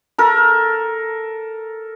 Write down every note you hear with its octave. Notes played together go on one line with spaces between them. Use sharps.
A4 A#4